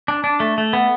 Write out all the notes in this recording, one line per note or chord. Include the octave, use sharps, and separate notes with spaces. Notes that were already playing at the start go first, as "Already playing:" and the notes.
D4
D4
A3
A3
B3